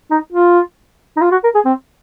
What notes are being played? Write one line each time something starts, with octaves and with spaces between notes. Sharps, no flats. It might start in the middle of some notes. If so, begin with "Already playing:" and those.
D#4
F4
D#4
F4
F#4
A#4
G#4
C4